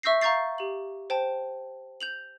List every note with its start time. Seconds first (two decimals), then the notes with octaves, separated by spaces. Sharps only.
0.03 E5 C#6 E6 G6 A#6 C7
0.21 F5 A#5 C#6 G6 A6 C7
0.58 G4 F#7
1.10 C5 G5 A5
2.01 G6 F7 F#7